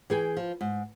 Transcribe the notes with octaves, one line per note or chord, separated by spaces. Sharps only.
E3 G#4 G5
F3
G#2